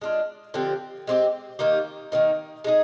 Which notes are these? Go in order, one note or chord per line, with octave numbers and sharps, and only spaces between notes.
G#3 D4 F4
D3 F3 C4 G4
G#3 C4 G4
D#3 A#3 D#4 G4
D#3 A#3 D#4
G#3 D#4 G#4